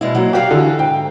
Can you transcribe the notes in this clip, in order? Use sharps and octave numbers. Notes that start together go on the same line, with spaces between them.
B2 G#3 E4
F#3 A#3
F#4 G4 C#5 F5
D3 E3
G#2 G5